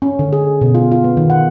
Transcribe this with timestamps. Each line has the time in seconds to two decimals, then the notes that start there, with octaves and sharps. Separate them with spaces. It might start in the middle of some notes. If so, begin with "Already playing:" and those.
0.02 C#4
0.19 D3
0.33 G#4
0.61 B2
0.74 F4
0.92 F4
1.04 B3
1.17 D#3
1.30 F#5